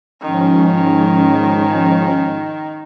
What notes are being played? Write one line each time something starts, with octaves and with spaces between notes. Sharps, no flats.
G#2 D#3 F3 C#4